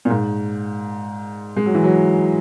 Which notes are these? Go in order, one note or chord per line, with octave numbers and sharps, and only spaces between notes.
A#2
G#2
G#3
F#3
E3
F#3